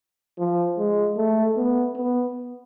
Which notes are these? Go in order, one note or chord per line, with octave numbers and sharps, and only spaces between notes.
F3
G#3
A3
B3
B3